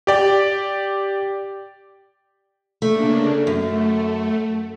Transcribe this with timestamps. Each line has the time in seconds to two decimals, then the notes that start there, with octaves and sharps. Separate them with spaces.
0.07 G4 D5 G5
2.82 C#3 A3 A#3 D4
3.47 F#2 A3